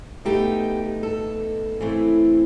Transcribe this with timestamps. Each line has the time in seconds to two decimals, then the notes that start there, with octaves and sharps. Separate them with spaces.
0.25 B2 A3 D#4 G4
1.03 A4
1.81 E3 A3 C4 E4